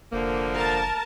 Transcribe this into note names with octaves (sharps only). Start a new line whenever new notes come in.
F1 D3 F3 A#3
A#4 A5